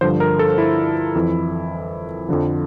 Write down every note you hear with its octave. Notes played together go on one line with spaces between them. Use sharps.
G2 D3 F3 C5
A#4
A4
E4
F2 E3
F2 D3 F3